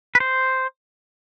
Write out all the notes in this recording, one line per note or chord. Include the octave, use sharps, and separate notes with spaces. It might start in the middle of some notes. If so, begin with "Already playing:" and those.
B4
C5